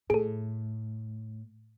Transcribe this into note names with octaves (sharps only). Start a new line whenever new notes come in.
A2 G#4 A4